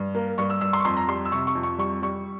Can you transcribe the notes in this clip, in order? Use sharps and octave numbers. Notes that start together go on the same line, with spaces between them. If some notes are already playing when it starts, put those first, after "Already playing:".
Already playing: G2
A#3
G2 C#6
E6
G2 E6
C6
C#6
F2 C6
A#5
G3 C6
E6
C3 C#6
C#6
F2
C#6
G3 C#6
G3 C#6